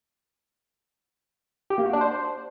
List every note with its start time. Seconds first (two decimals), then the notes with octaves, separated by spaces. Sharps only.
1.70 G4
1.78 A#3
1.86 F#4
1.93 D4
2.01 C5